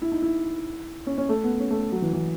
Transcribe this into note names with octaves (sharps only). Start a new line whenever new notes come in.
E4
D#4
E4
C#4
C#4
A3
B3
C#4
A3
F#3
E3
E3